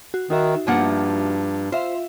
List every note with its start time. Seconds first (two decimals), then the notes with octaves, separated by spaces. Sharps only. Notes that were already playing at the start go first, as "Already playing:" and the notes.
0.14 F#4
0.30 D#3 D#4 F#4 E5
0.67 G2 F3 A#3 F#5
1.72 F4 C5 E5 F5